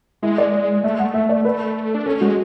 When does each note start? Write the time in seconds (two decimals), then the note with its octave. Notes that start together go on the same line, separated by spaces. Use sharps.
0.22 G#3 E4
0.38 D5
0.84 A3 E5
0.94 G#3 F#5
1.05 A3
1.14 E5
1.29 D5
1.45 A3 B4
1.95 D4
2.06 C#4 A4
2.21 G#3 F#4